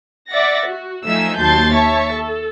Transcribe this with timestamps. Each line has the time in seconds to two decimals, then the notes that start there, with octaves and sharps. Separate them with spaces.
0.30 D5 E5 F#5 A6 A#6
0.68 F#4
1.06 F3 A3 D#4 E5 G#5 E6
1.38 D#2 F#3 A5 C6 G6 A6
1.74 C#5 E5 A5 C#6
2.13 A4